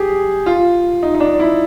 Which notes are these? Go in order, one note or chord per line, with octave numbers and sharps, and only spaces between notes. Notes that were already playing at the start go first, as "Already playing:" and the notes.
Already playing: G4 G#4
F4
D#4
D#4
D4
E4